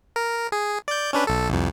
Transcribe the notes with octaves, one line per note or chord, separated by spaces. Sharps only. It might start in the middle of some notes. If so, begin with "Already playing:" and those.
A#4
G#4
D5 G6
C#4 D4 B4
B1 A4
C2 F2